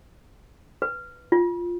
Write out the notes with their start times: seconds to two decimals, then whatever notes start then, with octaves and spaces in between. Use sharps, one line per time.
0.82 B4
1.32 F4